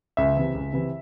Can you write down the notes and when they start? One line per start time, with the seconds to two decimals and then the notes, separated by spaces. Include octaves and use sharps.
0.17 C#2 E5
0.36 C3 E3
0.55 C#2
0.73 C3 E3